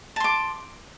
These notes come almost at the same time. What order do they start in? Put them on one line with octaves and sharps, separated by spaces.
A5 C6 D6